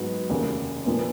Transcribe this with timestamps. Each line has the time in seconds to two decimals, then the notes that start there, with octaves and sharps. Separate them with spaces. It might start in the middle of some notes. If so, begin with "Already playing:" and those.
Already playing: G#2 F#3 B3 F#4
0.29 F1 D#2 C#3
0.86 A#2 F3 B3